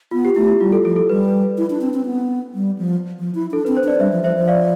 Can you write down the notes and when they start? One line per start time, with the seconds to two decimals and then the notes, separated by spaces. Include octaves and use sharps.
0.11 B3 F4
0.25 G4
0.36 A3 E4
0.48 E4
0.60 G3 F4
0.72 A4
0.85 F3 A4
0.96 A4
1.09 G3 B4
1.58 E4
1.70 D4
1.81 C4
1.94 C4
2.06 B3
2.54 G3
2.78 F3
3.19 F3
3.35 E4
3.51 D4 A4
3.65 C4 B4
3.77 C5
3.84 D4 D5
3.99 G3 C5 E5
4.12 F3
4.23 F3 C5 E5
4.36 F3
4.48 D5 F5